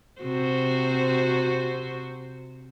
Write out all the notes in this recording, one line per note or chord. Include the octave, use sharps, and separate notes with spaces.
C3 F#4 C5